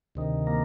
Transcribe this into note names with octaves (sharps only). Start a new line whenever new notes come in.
D2 C3 D#3
A#3